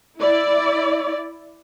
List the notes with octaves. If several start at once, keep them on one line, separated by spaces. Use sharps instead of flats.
E4 D5